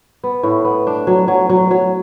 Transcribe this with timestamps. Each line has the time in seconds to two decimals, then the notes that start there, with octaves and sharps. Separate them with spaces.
0.23 B3
0.43 A2
0.64 B3
0.87 D4
1.07 F#3
1.28 F#3
1.49 F#3
1.71 F#3